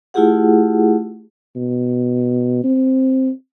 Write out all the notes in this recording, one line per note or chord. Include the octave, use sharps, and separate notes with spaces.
A3 E4 F4 G4 G#4 F#5
B2
C4